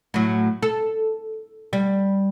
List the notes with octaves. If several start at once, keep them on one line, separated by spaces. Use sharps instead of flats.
A2 F#3
A4
G3